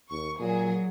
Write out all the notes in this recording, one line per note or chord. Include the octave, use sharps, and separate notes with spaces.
D#2 C#6
A#2 F#3 G#4